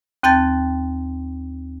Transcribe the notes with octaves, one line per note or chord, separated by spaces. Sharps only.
D#2 C4 G5 A5 G6 A6